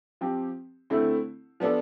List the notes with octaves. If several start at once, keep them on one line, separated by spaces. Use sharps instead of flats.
F3 C4 G4
D3 A3 C4 E4
F3 B3 D4 A4